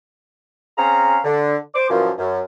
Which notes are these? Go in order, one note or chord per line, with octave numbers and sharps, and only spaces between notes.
C4 C#4 G#4 F5 A#5
D3
C5 D6
F#2 A#2 E3 F3
F#2